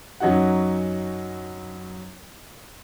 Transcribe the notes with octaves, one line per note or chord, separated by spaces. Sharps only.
F#2 F#3 C#4 D#4 F#4 F#5